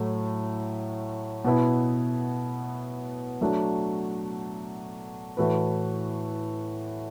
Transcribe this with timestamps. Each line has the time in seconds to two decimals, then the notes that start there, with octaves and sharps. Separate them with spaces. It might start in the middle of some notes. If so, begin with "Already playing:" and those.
Already playing: A2 F#3 A3
1.45 B2 B3 E4
3.41 F#3 A3 D4 F#4
5.37 A2 E3 A3 F#4 B4